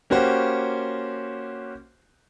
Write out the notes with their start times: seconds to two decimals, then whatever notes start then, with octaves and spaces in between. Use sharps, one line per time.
0.10 A#3 C#4 F#4 G4 C5